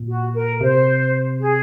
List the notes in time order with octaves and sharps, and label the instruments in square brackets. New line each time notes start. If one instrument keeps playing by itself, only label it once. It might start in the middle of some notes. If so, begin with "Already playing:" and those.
Already playing: [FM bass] A#2
[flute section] F#4
A#4
[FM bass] C3 [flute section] C5
[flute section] G#4